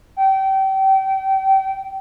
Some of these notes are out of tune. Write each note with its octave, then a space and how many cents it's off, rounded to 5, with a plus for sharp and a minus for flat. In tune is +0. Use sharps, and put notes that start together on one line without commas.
G5 -30